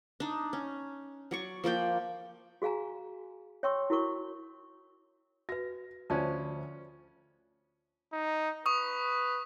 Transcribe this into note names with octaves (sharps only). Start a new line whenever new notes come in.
D4 D#4
C#4
F#3 D5 C#6
F3 A#3 D5 G5
F#4 G#4 F5 G#5 A#5
C#5 E5 G5 C6 C#6 E6
E4 F#4 A#4 C#6 D6
F#4 B4 A#6
D2 F3 C#4 C5 D5 A5
D#4
B4 C#6 D#6